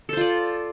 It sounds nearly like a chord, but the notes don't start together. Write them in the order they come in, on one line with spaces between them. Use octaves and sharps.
A4 C5 F4 D5